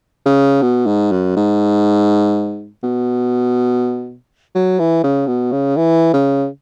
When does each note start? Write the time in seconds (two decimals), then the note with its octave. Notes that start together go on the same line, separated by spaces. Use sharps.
0.26 C#3
0.62 B2
0.87 G#2
1.12 F#2
1.37 G#2
2.83 B2
4.55 F#3
4.79 E3
5.04 C#3
5.27 B2
5.52 C#3
5.77 E3
6.14 C#3